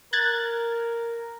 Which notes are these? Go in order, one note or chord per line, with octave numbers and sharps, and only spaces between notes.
A#4 F#6 G#6 A6